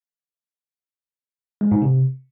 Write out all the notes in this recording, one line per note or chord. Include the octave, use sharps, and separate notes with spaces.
G#3
G#2
C3